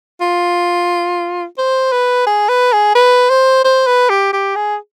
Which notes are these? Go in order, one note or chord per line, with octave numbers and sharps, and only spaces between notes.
F4
C5
B4
G#4
B4
G#4
B4
C5
C5
B4
G4
G4
G#4